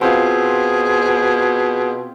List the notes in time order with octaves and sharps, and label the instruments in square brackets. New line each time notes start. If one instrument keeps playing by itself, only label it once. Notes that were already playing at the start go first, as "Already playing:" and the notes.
[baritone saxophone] B2 [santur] C4 F4 [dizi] G#4